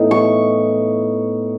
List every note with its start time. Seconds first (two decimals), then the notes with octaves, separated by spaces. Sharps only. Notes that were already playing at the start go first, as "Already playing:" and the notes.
Already playing: A2 E3 B3 D#4
0.11 C#6